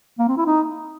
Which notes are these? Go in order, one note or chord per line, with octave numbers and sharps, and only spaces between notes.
A#3
C4
E4
D#4